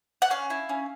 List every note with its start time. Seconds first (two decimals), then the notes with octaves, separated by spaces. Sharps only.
0.22 F#5
0.30 C#4 F5
0.50 E4
0.69 C#4